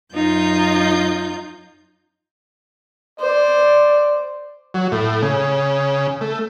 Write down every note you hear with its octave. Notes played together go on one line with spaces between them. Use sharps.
F#2 D#4 F4 G6
C5 D5
F#3
A2
C#3
A3